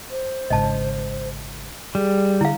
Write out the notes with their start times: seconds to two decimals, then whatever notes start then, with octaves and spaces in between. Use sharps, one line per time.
0.11 C5
0.50 G#1 G#2 C#3 D#5 A5
1.95 G3 G#4
2.41 D3 E4 F5